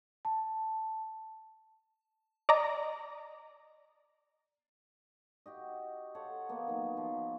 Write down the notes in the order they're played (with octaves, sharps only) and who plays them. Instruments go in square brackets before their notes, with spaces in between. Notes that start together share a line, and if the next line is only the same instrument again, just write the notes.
[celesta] A5
[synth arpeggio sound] D5 D#5 A#5
[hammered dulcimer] F#4 G4 D#5
A4 C5 C#5 F#5
A#3 B3
D#3 F#3
F3